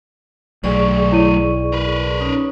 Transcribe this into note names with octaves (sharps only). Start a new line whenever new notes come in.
B1 F#3 A3 G#4 D5 C#6
E4 C#5 D#7
A#4 B4
C#4 D#4 C#5